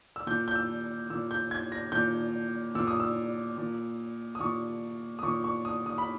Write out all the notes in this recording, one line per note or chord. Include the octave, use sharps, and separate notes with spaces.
E6
A#2 G6
G6
E6
A#2 E6
G6
G#6
A#6
A#2 G6
A#2 E6
D#6
E6
A#2
D#6
A#2 C#6
D#6
A#2 C#6
C#6
D#6
D#6
B5